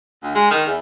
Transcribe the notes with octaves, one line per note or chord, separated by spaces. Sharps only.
D2
G#3
D#3
E2